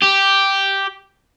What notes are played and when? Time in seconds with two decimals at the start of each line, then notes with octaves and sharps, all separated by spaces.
0.03 G4